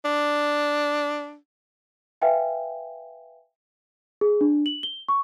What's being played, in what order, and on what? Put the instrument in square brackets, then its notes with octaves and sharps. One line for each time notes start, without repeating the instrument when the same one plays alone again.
[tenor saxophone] D4
[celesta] B4 E5 F5 G5 G#5
G#4
D4
F#7
G7
C#6